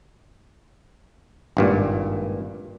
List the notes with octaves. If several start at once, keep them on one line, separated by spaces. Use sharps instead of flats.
G#1 G2 A#2